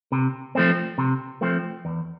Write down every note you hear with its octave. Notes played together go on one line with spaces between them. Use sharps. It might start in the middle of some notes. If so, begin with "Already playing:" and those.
C3
F3 A3 C4
C3
F3 A3 C4
E2